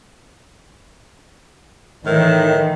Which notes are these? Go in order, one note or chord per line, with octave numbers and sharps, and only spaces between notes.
A2 D#3 E3 A#4